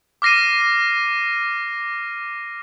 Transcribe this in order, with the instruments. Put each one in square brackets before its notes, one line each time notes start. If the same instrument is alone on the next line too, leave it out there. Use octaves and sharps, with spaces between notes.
[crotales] D6 F6 A#6 C7 D#7